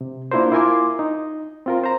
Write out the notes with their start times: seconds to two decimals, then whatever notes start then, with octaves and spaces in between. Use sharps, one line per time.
0.01 C3
0.31 A#3 D4 E4 F4 A#4 C5
0.52 E4 F4 A#4 G#5 C6 D6
0.99 D#4
1.66 C4 F4 A#4
1.84 C5 A#5